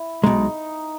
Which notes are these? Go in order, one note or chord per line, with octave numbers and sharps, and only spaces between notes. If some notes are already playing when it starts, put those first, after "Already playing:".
Already playing: E4
B1 B2 G#3 D#4